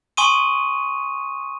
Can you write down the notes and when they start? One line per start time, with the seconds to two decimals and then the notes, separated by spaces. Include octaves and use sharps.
0.17 G#5 C6 C#6 D#6 D#7